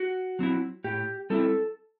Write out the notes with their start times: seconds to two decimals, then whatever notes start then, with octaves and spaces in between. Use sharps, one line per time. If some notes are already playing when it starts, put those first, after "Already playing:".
Already playing: F#4
0.39 F#3 C4 E4
0.84 A2 G4
1.30 G3 C4 E4 A4